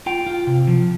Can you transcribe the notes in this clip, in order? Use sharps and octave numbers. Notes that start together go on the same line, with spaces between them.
F4 G5
F4
C3
F3